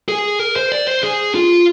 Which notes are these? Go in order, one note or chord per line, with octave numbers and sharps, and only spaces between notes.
G#4
A#4
C5
D5
C5
G#4
F4